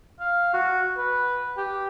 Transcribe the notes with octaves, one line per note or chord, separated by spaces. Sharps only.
F5
F#4
B4
G4